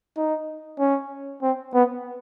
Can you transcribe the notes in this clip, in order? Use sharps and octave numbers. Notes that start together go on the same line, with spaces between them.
D#4
C#4
C4
B3